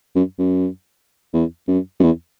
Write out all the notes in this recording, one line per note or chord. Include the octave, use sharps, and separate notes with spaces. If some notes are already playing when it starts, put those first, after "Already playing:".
F#2
F#2
E2
F#2
F#2
E2